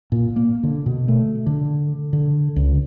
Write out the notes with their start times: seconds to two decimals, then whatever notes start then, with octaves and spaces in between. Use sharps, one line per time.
0.12 A#2
0.36 A#3
0.63 D3
0.86 B2
1.08 A3
1.46 D3
2.13 D3
2.56 C#2